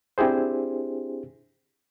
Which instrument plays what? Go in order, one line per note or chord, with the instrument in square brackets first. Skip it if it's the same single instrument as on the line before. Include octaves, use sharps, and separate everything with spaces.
[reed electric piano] C4 D4 E4 G4 G#4 C5